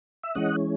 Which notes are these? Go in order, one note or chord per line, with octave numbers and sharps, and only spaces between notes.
E5
E3 G#3 C#4 D#5 F#5